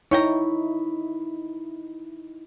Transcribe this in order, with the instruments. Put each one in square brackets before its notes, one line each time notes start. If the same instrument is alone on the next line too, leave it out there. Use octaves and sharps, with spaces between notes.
[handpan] D#4 E4 [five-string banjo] C#5 G5 A#5